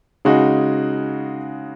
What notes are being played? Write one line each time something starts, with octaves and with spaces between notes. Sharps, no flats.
C#3 G#3 D#4 F#4